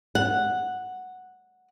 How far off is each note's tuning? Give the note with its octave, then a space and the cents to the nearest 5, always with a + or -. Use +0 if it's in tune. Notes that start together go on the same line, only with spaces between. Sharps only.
F#5 -5